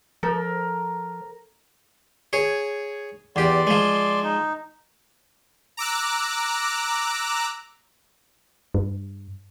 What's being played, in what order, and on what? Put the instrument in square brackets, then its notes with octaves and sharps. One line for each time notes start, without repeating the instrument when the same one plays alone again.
[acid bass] F3 [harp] A4 [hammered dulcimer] A#4
[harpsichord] G#4 C#5
[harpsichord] E2 G4 [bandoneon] D5 C6
[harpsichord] F3 G#3
[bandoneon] D#4
[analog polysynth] A#5 D6 E6 F#6
[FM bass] G2